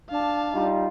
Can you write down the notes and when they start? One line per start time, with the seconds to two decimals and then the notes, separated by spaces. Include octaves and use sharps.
0.10 D4 F5 A5
0.53 G3 D#4 F4